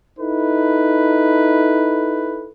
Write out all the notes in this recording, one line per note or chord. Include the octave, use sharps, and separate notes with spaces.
D#4 E4 A4 B4